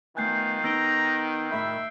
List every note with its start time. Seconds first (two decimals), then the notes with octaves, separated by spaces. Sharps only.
0.17 D#3 A3 B3 F4 G#5 F#6 G6 C7
0.64 B3 D#4 A#5 E6 D7 G7
1.51 A2 A#4 E5 B5